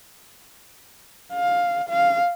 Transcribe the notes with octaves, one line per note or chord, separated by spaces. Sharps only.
F5
F5